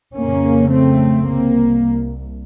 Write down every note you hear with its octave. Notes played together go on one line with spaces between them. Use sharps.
F2 C#3 A#3 C#4
A3 C4
C2 A#3